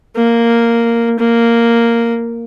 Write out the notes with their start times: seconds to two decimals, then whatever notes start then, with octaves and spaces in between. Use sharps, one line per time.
0.16 A#3
1.19 A#3